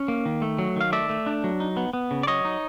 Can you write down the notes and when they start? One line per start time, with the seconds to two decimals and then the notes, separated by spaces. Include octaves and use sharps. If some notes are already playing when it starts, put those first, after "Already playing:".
Already playing: C#4
0.08 A#3
0.25 D#3
0.42 A3
0.59 F#3
0.76 D#3 F5
0.92 A3 D5 E5
1.10 A3
1.26 D4
1.44 F#3
1.60 D#4
1.77 B3
1.93 B3
2.11 C#3
2.23 D5
2.27 F#3 C#5 D#5
2.45 D#4